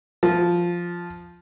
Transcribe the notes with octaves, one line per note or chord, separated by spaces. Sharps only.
F3